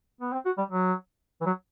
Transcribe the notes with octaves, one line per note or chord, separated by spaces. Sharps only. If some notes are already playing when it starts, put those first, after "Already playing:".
B3
C4
F#4
G3
F#3
E3
F#3